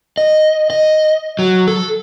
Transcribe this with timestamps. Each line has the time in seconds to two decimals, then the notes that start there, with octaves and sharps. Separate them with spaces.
0.18 D#5
0.70 D#5
1.39 F#3
1.68 A4